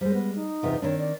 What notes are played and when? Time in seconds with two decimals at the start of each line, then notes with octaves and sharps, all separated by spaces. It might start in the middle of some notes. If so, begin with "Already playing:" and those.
0.01 G3 G#3 C5
0.14 B3
0.35 D#4
0.63 E2 C3 F4
0.82 D#3 C4 D4 C#5
0.98 D5